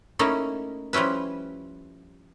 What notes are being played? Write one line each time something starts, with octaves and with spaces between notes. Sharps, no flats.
A3 A#3 C#4 D#4 E4
F3 G3 C#4 E4 B4